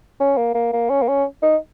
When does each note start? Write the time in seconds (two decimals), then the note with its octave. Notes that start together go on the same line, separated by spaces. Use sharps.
0.20 C#4
0.37 A#3
0.55 A#3
0.73 A#3
0.90 C#4
1.02 A#3
1.08 C#4
1.43 D#4